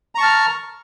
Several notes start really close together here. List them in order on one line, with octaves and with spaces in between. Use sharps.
A#5 C#6 A5 F6